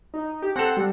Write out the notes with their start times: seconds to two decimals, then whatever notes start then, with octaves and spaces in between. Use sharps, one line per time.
0.14 D#4
0.42 G4
0.56 C4 A4 F#5
0.77 G3